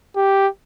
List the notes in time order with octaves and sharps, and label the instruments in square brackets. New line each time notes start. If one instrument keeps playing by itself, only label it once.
[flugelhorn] G4